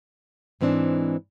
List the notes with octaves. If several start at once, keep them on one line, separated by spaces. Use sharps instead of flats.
G#2 E3 B3 C4 D4